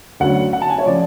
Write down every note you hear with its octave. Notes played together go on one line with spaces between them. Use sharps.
D2 D3 F#3 C#4 F#5
F#5
A5
G#5
C#5
C#3 F3 D5